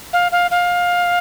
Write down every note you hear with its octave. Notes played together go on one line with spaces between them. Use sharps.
F5
F5
F5